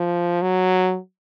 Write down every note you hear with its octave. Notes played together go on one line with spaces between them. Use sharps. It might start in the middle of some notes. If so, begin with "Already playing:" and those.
Already playing: F3
F#3